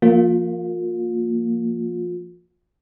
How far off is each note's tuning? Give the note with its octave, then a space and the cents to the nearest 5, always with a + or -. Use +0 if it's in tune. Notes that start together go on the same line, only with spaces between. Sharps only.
F3 -30 A#3 -15 F4 +30